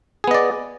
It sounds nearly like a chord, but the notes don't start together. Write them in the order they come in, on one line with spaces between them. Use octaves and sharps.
G#4 B3 D#5 D5